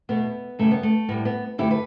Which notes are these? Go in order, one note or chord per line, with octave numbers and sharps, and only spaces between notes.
E2 B2 A3 B3
F#2 C#3 G3 A3
B3
A3
A2 G3 B3
B3
F#2 D3 A3 E4 G4
B4